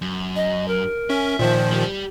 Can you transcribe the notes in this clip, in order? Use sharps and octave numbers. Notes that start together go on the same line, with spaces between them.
F#2
D#5
A#4
C#4 E5
A#2 D#3 F3 C5
G3 G4